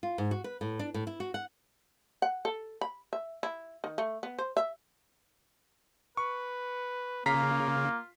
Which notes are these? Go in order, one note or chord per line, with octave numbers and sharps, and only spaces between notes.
F4
G#2
F#4
B4
A2
D4
A2
E4
F#4
F#5
F#5
A4
B5
E5
E4
D#3
A3
B3
C5
E5
B4 C#6
C#3 A#3 F4 A#5 B6 C7